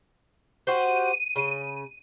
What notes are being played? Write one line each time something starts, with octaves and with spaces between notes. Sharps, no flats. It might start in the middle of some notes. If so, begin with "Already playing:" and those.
F#4 G4 C5 D#7
C#3